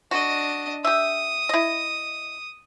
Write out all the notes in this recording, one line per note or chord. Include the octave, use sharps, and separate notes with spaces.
D4 F#4 D#5
G4 E5 D#6
E4 D#5